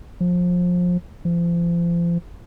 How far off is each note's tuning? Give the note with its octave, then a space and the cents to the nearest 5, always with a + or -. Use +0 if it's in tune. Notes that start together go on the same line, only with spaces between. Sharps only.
F3 +25
F3 -35